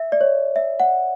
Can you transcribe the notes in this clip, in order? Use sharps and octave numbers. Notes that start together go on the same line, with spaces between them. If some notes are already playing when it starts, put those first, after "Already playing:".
Already playing: E5
D5
C#5
E5
F#5